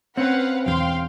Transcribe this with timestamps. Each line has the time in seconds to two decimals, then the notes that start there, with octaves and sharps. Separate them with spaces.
0.17 C4 C#4 B4 F5 F#5
0.66 E1 E2 F5 G5 C6